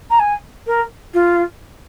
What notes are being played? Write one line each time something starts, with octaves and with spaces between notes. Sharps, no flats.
A#5
G#5
A#4
F4